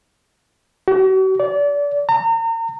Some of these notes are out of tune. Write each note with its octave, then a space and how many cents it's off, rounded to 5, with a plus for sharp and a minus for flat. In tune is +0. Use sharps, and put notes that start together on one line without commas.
F#4 +45
D5 -30
A#5 -35